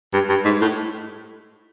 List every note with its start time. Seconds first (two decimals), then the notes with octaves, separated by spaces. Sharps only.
0.13 G2
0.29 G2
0.45 G#2
0.62 A2